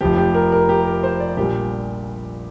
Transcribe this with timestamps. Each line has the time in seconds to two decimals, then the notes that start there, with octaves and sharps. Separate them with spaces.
0.01 F1 F2 F3 G4
0.17 G4
0.34 A#4
0.52 A#4
0.69 G4
0.85 A#4
1.03 C5
1.20 D5
1.37 A#1 A#2 G3 G4